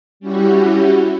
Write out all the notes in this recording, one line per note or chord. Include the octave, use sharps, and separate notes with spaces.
G3 C#4 E4 F#4 G4